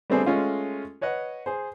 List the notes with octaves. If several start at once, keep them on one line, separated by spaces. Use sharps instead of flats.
G3 A3 B3 C4 D4 G#4
G#3 A3 C#4 F4
B4 C#5 D#5 F#5
G#4 C5